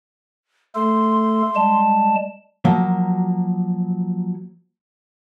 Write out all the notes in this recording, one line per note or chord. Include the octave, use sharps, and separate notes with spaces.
A3 A4 C6
G3 G#3 A5
F3 F#3 A#3